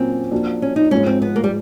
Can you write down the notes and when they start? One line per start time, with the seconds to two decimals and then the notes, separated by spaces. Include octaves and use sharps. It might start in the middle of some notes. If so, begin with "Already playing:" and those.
Already playing: A#2 F#3 A#3 C4 C#4
0.31 F3 A#3 D4 F#4
0.62 C#4
0.76 D#4
0.91 G#2 F3 G#3 C#4
1.06 C4
1.22 B3
1.36 A#3
1.44 G3